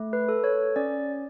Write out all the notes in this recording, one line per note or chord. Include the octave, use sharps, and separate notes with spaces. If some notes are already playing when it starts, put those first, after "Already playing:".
Already playing: A3
B4
A4
C#5
C#4 D5